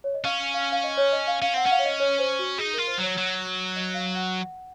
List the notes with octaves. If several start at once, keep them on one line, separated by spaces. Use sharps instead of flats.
C#5
D#5
C#4 F5
F5
F5
D#5
C#5
D#5
F5
C#4 F5
C4 F#5
C#4 F#5
F5
C#5
D#5
C#5
C5
F#4
D#4 G#4
F4 A#4
C5
F#3 C#5
F#3
D#5
F5
F#5